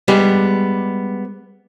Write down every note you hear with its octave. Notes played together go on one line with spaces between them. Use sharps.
G3 G#3 B3 G4